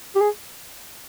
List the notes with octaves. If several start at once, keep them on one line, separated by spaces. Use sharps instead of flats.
G4
G#4